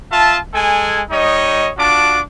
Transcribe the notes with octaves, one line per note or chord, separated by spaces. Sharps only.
F4 E5 A5
G#3 A4 G#5
G3 D#4 C#5 D#5
D4 F4 F#4 A5 D6